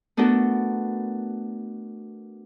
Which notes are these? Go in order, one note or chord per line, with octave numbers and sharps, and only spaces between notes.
A3 B3 D4 F#4 A4 A#4